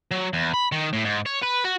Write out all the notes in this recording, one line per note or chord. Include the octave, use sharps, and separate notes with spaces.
F#3
E2
B5
D#3
A2
G#2
C#5
B4
F#4